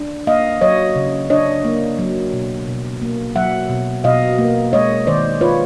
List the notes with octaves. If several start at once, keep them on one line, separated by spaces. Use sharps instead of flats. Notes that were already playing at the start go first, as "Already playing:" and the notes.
Already playing: D4
A#3 D#5 F5
F#3 C#5 D#5
C#3
D4 C#5 D#5
A#3
F#3
B2
B2
A#3
F#3 E5 F#5
B2
B2 D#5 F5
A#3
G#3 C#5 D#5
D#3 C5 D5
F4 B4 C#5